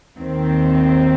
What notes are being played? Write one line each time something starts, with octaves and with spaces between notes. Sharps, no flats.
D#2 D#3 C4